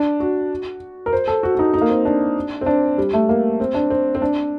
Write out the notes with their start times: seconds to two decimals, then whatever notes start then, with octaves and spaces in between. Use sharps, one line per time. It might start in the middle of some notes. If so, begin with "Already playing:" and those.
Already playing: D4
0.20 F#4
1.06 A#4
1.13 C5
1.28 A4
1.43 F#4
1.55 F#4
1.59 D#4
1.74 D#4
1.81 A#3
1.89 C4
2.05 D4
2.61 C4
2.66 D4
2.98 G3
3.13 A3
3.29 A#3
3.60 C4
3.74 D4
3.90 C4
4.15 C4
4.22 D4